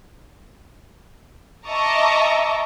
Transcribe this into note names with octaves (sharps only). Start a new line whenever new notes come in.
D#5 E5 A5 A#5 C#6 D6